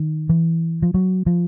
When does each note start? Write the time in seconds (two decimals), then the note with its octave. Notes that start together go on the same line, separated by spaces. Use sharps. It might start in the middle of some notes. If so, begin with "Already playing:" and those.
Already playing: D#3
0.29 E3
0.82 F3
0.94 F#3
1.26 F3